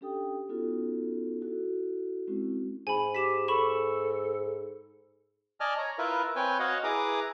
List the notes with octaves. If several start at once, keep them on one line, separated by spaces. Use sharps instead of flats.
C#4 D4 G4 A4 G5 D#6
B3 C#4 D#4 F4 F#4 A4
E4 F#4 A4
G#3 C4 C#4 E4 F#4
G#2 G#5 B5
G4 B6 E7
A4 B5 C#6 E7
D5 D#5 G#5 A5 F6
C#5 A#5
E4 F4 A#4 B4 E5
C4 B4 C#5 G5 G#5
F#4 C#5 D#5 F5 F#5
E4 G#4 B4 A#5 D6 D#6